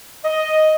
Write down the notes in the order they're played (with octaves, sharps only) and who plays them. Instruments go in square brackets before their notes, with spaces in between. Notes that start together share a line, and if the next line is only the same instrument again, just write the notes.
[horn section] D#5